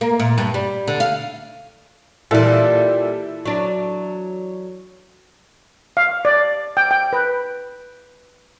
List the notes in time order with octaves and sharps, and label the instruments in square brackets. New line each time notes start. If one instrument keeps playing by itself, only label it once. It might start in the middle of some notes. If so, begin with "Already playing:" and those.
[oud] A#3
A#2
G2
G3
D3
F5
[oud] A#2 G3 [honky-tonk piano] E3 E4 A4
[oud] F#3 D4
[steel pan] F5
D5
G5
G5
B4